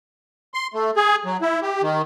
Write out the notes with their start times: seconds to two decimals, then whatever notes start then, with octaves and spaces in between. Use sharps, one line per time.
0.54 C6
0.74 A3
0.96 G#4
1.26 F#3
1.41 E4
1.62 G4
1.82 D#3